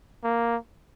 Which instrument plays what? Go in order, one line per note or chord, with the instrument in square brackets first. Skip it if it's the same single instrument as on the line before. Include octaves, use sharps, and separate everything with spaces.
[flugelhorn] A#3